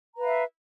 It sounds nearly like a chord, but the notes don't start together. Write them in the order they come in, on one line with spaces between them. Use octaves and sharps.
A#5 B4 F5 E5